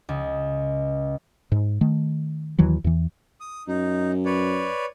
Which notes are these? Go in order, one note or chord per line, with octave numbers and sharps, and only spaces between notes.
C#2
G#2
D#3 A3
D#2 D#3 E3 F#3
E2 E3
D#6
F#2 D#4
B4 C#5 D5